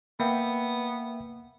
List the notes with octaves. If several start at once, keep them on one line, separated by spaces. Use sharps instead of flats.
A#3 B3 E5 G5